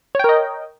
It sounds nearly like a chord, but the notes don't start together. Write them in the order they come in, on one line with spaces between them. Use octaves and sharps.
C#5 G5 A#4 D#5